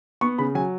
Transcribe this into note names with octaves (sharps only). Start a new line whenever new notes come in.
B3 C#6
C#3 B5
F#3 G#5